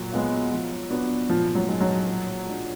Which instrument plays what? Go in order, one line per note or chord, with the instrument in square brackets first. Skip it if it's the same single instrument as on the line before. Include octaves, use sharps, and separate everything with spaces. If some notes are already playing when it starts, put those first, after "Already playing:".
Already playing: [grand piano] A#2 [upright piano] F#3
[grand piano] G#3 B3 F4
F3
B3 D4 F#4
[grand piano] A#2 [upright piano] F3
[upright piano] F#3
[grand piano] G#3 D#4 F#4
[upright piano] F#3
[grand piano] A#2
G#3 D4